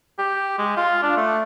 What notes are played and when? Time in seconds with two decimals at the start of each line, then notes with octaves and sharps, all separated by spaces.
0.19 G4
0.59 G#3
0.77 F4
1.03 D4
1.17 A3